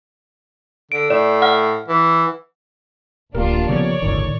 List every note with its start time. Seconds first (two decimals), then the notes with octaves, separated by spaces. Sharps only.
0.92 D3 D7
1.10 A2 D5
1.42 F#5 F6
1.88 E3
3.35 D1 A#1 A#3 D4 F4 G4 A#4
3.69 C#3 F3 B3 C#5 D5
4.02 G1 C#2 A2 D#3